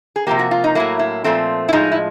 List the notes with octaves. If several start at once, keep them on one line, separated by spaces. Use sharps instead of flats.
G#4
C3 F3 A#3 G4
F#4
F4
D#4
A2 F#3 A#3 E4
E4
A#2 F3 A3 C4
E4
A2 F3 G#3 D#4
E4